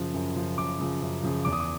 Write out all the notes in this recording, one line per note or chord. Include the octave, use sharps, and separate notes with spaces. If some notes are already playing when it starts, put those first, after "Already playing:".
Already playing: F#2 C#3 F3
F#2
C#3 F3
F#2 D6
C#3 F3
F#2
C#3 F3
E2 D6
D#6
D6